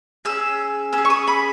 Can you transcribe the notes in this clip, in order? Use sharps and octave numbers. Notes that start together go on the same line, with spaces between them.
C#4 G#4 E6
C#4 G#4 E6
C#6
D#6
B5